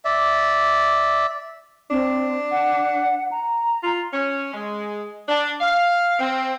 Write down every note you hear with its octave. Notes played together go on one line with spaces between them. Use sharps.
D5 E5
C4 D4
F#5
A#5
F4
C#4
G#3
D4
F5
C4